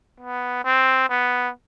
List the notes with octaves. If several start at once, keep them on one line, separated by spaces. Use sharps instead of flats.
B3
C4
B3